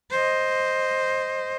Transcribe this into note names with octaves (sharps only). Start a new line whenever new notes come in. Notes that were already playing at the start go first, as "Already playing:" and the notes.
C5 D#5